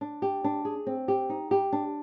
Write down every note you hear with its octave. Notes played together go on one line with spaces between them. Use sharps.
D4
G4
D4
G#4
C4
G4
D#4
G4
D4